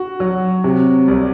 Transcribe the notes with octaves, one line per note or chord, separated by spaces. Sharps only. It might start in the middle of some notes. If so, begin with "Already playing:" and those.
Already playing: F#4
F#3
C3
C2